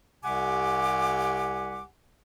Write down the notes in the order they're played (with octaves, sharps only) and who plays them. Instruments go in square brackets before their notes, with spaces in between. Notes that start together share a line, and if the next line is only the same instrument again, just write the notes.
[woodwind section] C2 C3 G4 F#5 G#5 D6